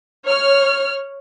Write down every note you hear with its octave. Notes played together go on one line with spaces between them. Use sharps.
C#5 F6